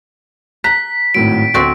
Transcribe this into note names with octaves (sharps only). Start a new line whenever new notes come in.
A#5 F#6 B6
G#1 A2 F#3 D7
D2 C4 F#4 D5